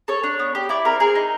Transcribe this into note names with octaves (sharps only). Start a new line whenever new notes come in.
A4 C#5
D4
B3
G4
E4 D5
C4 A#4
G#4 A#4
D#4